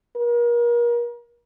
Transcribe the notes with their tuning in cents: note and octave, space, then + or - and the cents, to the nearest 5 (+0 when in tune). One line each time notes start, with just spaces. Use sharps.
A#4 +35